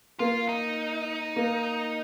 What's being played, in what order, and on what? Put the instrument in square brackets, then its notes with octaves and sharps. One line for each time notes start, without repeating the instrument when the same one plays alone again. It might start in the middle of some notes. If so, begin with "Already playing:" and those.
[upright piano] A#3 [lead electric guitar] F4
[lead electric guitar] D#4
[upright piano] A#3